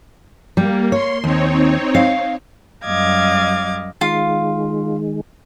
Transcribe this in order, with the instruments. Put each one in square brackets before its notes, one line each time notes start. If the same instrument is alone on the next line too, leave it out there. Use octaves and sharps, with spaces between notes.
[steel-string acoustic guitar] G3 [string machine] A#3
[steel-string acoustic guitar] C#5 [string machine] C6
[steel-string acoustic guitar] D#2 [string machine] C4 D#4 C#5
[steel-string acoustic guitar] F5
[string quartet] F#2 G3 D#5 F5 D6 G#6
[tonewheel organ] D#3 G#3 [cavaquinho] F4 F5